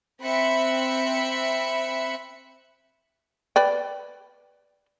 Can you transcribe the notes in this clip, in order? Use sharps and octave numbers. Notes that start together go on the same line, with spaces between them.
C4 E5 B5 F#6 C#7
B4 D5 G5